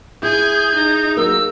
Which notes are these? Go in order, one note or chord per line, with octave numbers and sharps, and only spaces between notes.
E4 G#4 G#5 G6
D#4 G#4
F#3 A#3 A#4 E6